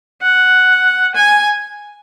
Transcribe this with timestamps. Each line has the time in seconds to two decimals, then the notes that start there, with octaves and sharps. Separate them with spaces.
0.22 F#5
1.15 G#5